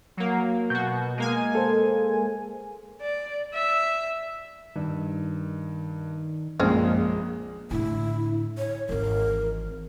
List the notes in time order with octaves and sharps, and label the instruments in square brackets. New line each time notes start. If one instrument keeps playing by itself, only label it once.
[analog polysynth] F#3 A#3
[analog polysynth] B2 F#4 [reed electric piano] G6
[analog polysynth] B2
G#3 A#3 G#5
[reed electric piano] A4 C5
[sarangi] D5
E5
[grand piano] G2 [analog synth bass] D#3
[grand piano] A#1 G#3 [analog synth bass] F#2 [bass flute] A#3 [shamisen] C4 C#4 G#4
[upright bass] A2 D3 [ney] E4
[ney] C#5
[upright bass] G#1 E3 [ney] A#4